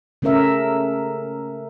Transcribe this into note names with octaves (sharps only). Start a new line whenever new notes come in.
C#3 A3 C#4 A#4 E5